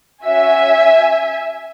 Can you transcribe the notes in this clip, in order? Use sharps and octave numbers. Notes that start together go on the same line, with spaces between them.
C#4 F#4 E5 G#5